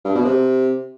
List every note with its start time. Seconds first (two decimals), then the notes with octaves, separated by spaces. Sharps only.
0.05 G2
0.15 B2
0.25 C3